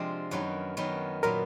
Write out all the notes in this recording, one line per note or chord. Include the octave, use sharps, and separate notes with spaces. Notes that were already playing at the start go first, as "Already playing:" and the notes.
Already playing: C3 F3 G#3 C4 D4
F#2 D#3 F#3 B3
F#2 D#3 F#3 B3
A#2 F#3 B3 A#4